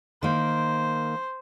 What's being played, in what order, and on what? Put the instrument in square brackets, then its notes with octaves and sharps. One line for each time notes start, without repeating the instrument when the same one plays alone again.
[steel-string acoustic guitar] D#3 A#3 [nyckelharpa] C5